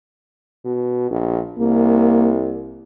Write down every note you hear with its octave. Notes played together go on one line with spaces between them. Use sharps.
B2
A#1
C2 A#3